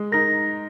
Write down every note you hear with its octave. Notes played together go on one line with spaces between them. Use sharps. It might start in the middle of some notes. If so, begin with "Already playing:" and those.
Already playing: G#3
D#4 A#4 A#6